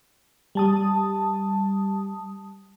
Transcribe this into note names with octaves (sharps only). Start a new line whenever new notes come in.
G3 A5 D#6